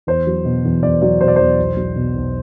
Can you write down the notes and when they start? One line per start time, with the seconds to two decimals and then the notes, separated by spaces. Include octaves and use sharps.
0.07 E2 C5
0.27 F#3
0.45 B2
0.65 E2
0.83 E2 D5
1.02 F#3 D5
1.21 B2 C5
1.28 D5
1.36 E2 C5
1.59 B1
1.77 F#3
1.96 B2
2.16 B1